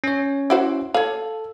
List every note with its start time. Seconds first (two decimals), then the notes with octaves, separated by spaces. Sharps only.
0.04 C#4 C#5
0.50 E4 F#4 C5
0.94 A4 C#5 F5